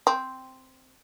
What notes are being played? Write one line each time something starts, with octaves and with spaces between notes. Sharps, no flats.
C4